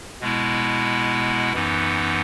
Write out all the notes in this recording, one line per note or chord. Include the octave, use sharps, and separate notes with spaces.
B2 G#3 B3 E4
F#2 E3 B3 D#4